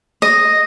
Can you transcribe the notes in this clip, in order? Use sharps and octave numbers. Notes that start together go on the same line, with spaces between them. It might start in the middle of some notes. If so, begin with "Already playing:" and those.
D#5